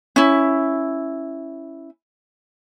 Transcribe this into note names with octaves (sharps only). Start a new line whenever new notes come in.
C#4 E4